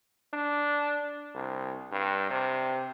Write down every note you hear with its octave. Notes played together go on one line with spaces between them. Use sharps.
D4
C2
G2
C3